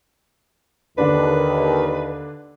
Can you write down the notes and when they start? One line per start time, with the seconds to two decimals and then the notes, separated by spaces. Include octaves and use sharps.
0.98 D#2 D3 D4 B4